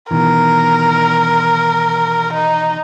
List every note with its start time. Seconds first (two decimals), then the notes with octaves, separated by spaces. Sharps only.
0.11 B2 D#3 E3 A#4
2.34 D#4